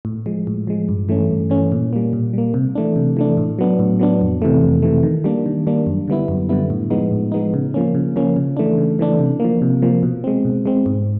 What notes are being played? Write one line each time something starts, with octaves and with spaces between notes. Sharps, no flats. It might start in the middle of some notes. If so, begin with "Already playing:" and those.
A2
F3 G#3
A2
F3 G#3
G2
E3 A3 C#4
G2
E3 A3 C#4
A#2
G3 A#3
A#2
G3 A#3
C3
E3 A3 D4
C3
E3 A3 D4
A2
F#3 B3 D4
A2
F#3 B3 D4
F2
C3 E3 A3
F2
C3 E3 A3
D#3
G3 A#3 D4
D#3
G3 A#3 D4
F#2
D3 G3 B3 E4
F#2
D3 G3 B3 E4
A2
F3 G#3 B3 D#4
A2
F3 G#3 B3 D#4
C#3
F3 A#3 C#4
C#3
F3 A#3 C#4
C#3
E3 A3 D4
C#3
E3 A3 D4
C3
F3 A#3
C3
F3 A#3
B2
G#3 C4
B2
G#3 C4
G#2